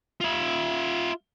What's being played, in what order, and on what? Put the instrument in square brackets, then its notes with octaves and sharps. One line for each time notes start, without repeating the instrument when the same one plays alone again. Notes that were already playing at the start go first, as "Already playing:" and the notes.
[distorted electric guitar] F4 E5